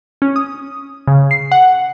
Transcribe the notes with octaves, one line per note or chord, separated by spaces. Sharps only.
C#4
D#6
C#3
C7
F#5